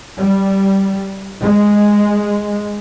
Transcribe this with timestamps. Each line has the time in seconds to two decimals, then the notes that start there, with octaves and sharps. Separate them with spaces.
0.16 G3
1.42 G#3